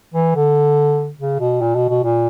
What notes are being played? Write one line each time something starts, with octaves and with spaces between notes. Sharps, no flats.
E3
D3
C#3
B2
A#2
B2
B2
A#2